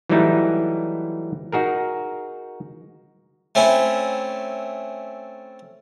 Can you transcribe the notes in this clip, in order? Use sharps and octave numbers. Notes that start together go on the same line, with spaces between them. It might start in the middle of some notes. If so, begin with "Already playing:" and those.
E3 F#3 G3 A3 D#4 E4
D#4 F#4 G#4 A#4
A3 C4 C#4 E4